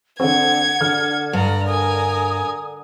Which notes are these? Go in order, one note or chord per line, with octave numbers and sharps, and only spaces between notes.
D3 C4 F#5 G#6
D3 F6
G2 D5 A#5
A#4 G#5 D#6